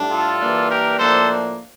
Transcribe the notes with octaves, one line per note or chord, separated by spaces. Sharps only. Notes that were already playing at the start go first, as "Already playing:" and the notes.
Already playing: A2 G3 D4
F4 A4
E3 G3 A#3 D4
G4 A#4
A2 F3 A#3 D4 A4 C5